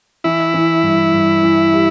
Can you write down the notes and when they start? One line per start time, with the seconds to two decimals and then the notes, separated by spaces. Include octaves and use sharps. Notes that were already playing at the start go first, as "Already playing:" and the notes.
0.24 E3 E4
0.54 E3
0.83 G2
1.13 G2
1.43 E3
1.73 G3